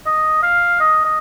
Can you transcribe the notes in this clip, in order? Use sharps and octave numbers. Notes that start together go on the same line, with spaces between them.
D#5
F5
D#5
D#5